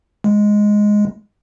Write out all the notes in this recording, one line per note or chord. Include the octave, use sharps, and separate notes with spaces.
G#3